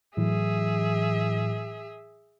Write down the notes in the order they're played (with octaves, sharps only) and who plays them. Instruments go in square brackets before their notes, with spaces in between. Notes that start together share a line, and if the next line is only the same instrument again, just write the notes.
[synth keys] A2 E3 F#3 [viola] G#4 E5